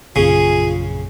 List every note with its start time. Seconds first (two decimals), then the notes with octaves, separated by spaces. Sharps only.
0.16 A#1 F#2 C#3 F4 G#4